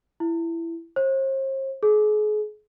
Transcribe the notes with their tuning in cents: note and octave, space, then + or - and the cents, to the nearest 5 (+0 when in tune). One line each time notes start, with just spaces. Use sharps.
E4 +15
C5 +40
G#4 +35